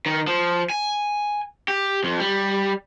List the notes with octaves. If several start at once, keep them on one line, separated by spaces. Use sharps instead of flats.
D#3
F3
G#5
G4
F2
G3